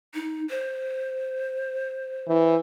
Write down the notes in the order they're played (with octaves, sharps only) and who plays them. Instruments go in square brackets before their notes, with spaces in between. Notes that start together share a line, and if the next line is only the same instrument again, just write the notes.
[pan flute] D#4
C5
[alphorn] E3